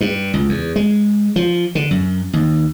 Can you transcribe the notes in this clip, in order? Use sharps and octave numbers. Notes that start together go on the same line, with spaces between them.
G2
C#2
E2
G#3
F3
D3
F#2
D#2